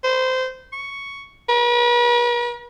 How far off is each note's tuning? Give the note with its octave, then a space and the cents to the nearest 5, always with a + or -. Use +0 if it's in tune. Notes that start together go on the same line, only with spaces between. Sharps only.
C5 -20
C#6 +5
B4 -45